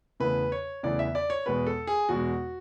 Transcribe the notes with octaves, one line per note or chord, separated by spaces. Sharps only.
E2 C#3 E3 A3 B4
C#5
E2 C#3 E3 A3 D5
E5
D5
C#5
E2 B2 G#3 B4
A4
G#4
E2 B2 G#3 F#4